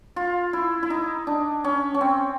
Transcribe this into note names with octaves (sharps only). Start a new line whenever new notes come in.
F4
E4
E4
D#4
D4
C#4
C#4
C4